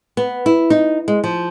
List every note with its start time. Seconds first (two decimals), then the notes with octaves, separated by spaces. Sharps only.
0.17 B3
0.46 E4
0.70 D#4
1.08 G#3
1.24 F3